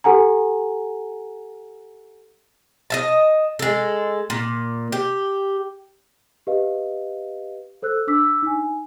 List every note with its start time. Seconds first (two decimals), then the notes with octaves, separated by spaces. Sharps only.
0.04 G4 A4 F#5 G#5 A#5
2.90 D#5 E5 A5
3.59 G#3 A4
4.30 A#2
4.92 G4
6.47 G4 B4 D#5 F5
7.82 A4 C5 E6 F#6
8.07 D4 D6 E6 B6
8.42 D#4 G#5